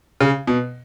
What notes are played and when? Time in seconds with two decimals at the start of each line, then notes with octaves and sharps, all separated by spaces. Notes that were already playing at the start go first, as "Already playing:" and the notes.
0.21 C#3
0.47 B2